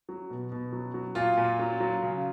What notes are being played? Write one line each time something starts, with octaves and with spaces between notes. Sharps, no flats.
F#3
B2
B2
F#3
F#3
A#2 F4
A#2
F#3
F#3
C#3